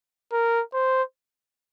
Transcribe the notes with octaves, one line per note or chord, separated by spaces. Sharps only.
A#4
C5